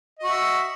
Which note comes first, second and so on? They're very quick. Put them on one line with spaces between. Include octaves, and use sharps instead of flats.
D#5 F#4 E5